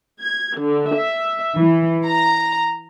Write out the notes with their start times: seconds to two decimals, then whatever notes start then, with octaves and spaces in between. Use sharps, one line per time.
0.21 G#6
0.58 D3
0.94 E5
1.57 E3
2.07 A#5